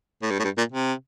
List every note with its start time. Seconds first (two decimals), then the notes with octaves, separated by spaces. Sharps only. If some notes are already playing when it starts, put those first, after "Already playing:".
0.23 A2
0.31 G2
0.39 A2
0.44 G2
0.58 A#2
0.72 C3